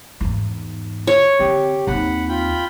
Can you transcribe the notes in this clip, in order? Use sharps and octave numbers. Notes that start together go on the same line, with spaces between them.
E2 G#2
C#5
D3 C4 G4
D#2 C4 F#5 B5
F4 G5 B5